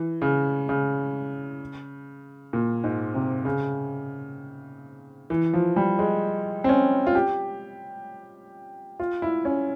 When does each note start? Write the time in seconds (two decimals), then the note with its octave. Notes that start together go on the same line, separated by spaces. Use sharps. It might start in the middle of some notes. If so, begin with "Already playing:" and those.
Already playing: E3
0.22 C#3
0.69 C#3
2.53 A#2
2.84 G#2
3.14 C3
3.45 C#3
5.30 E3
5.53 F3
5.76 G3
5.99 G#3
6.64 C4
6.69 C#4
7.07 F4
7.15 G4
8.99 F4
9.22 E4
9.45 C#4